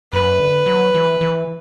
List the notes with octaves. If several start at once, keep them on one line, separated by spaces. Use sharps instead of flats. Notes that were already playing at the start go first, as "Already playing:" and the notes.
F#2 B4
D3
F#3
E3
E3